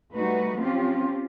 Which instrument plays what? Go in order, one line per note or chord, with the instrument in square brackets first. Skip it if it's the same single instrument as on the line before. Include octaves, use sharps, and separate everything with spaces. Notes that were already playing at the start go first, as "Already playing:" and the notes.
[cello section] G3 A3 D#4 F#4 B4
F3 C4 C#4 F4 G4